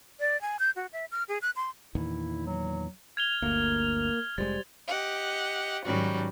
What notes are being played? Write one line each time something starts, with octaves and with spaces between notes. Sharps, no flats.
D5
G#5
G6
F#4
E5
F6
G#4
F#6
C6
E2 A#2 D#3 E4
F#3
F6 G#6 F7 G7
G1 D2 A#3
F1 G#2 G3 G#3 C5 A6
G4 D#5 F#5
G#2 D#3 F#3 G3 C#4 F#4